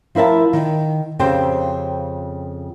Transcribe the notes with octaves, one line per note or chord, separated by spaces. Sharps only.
F3 E4 A#4 E5 A5
D#3
F2 C#3 C4 G4 C5